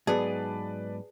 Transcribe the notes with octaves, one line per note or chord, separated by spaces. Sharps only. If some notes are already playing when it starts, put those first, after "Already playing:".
G#2 F#3 B3 G#4 B4 D5 A5